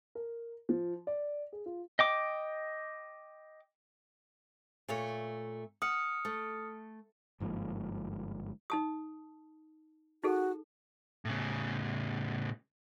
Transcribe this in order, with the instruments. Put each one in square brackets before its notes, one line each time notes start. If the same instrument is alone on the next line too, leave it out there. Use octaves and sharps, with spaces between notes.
[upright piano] A#4
F3
D5
G#4
F4
[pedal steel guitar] D#5 G5 D6
[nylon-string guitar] A#2 A3 C#5
[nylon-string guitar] F#5 [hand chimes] D#6 F6 C#7
[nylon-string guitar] A3
[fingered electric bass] G1 G#2 F3 A#3
[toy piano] D#4 A5 D#6
[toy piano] D#4 G#4 A4 [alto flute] F#4
[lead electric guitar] A2 C#3